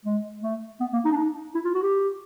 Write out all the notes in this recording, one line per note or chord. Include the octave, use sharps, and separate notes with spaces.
G#3
A3
B3
A#3
D#4
D4
D#4
E4
F4
F#4
G4